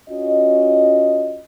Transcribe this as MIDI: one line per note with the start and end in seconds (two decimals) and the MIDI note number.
0.10 1.41 61
0.10 1.41 65
0.10 1.41 66
0.10 1.41 75